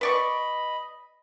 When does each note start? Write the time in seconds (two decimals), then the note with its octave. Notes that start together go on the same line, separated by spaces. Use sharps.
0.01 B4 D5 D#5 B5 C#6